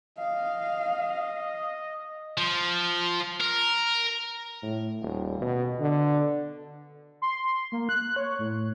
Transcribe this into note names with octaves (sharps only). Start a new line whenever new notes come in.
D#5 F5
F3
A#4
A2
D#1
B2
D3
C6
A#3
F#6
C#5
A2